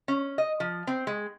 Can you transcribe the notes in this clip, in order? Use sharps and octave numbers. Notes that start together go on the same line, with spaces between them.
C#4
D#5
F3
C4
G#3